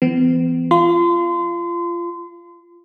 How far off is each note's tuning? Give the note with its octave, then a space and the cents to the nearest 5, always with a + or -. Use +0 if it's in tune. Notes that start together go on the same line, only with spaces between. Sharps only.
E3 +25 B3 +45
F4 -20 C6 -30